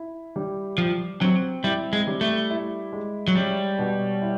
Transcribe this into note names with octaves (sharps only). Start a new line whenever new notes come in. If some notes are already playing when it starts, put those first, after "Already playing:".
Already playing: E4
G3
F3 G4
F#3 C4
G3 E4
G#3
G3
A3
E4
G#3
F#3
G3 C#4
B2
E4